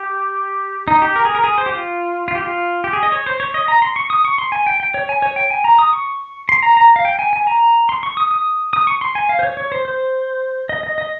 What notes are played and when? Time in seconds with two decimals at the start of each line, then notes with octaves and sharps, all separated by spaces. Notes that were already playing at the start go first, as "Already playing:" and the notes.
Already playing: G4
0.88 D#4
1.02 G4
1.16 A#4
1.25 G#4
1.35 A#4
1.44 G#4
1.58 C5
1.66 G4
1.72 F4
2.28 F4
2.35 G4
2.43 F4
2.84 G4
2.93 G#4
3.03 D#5
3.12 C#5
3.26 C5
3.40 C#5
3.54 D#5
3.68 A#5
3.82 C6
3.96 C#6
4.10 D#6
4.25 C#6
4.38 C6
4.52 G#5
4.67 G5
4.80 G5
4.94 C#5
5.09 G#5
5.22 C#5
5.36 G5
5.50 G#5
5.64 A#5
5.79 D#6
5.93 C#6
6.49 C6
6.63 A#5
6.77 A#5
6.96 F5
7.05 G5
7.19 G#5
7.33 G#5
7.47 A#5
7.89 C6
8.03 C#6
8.17 D#6
8.31 D#6
8.73 D#6
8.87 C#6
9.01 C6
9.15 G#5
9.29 F5
9.39 C5
9.43 C#5
9.57 C#5
9.72 C5
9.85 C5
10.69 D#5
10.83 D#5
10.98 D#5